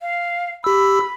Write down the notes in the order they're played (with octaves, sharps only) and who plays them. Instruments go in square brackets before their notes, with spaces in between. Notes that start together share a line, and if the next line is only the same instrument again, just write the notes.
[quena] F5
[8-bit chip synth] G4 E6 [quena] B5